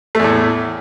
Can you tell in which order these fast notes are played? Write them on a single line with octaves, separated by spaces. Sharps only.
A3 E2 A2